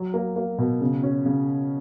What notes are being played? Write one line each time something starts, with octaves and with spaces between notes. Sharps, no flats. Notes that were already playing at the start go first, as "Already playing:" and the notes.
Already playing: F#3
A#3
A#3
B2
C#3
C#4
C#3